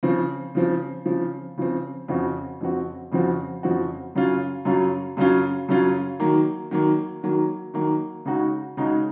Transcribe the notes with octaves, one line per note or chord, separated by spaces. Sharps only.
C#3 F3 C4
C#3 F3 C4
C#3 F3 C4
C#3 F3 C4
F2 C#3 F3 C4 F#4
F2 C#3 F3 C4 F#4
F2 C#3 F3 C4 F#4
F2 C#3 F3 C4 F#4
F#2 C#3 F#3 C#4 F4
F#2 C#3 F#3 C#4 F4
F#2 C#3 F#3 C#4 F4
F#2 C#3 F#3 C#4 F4
D#3 F#3 A#3
D#3 F#3 A#3
D#3 F#3 A#3
D#3 F#3 A#3
C#3 G#3 D#4 F#4
C#3 G#3 D#4 F#4